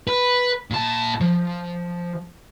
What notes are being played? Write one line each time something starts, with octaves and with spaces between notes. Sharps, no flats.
B4
A#2 A5
F3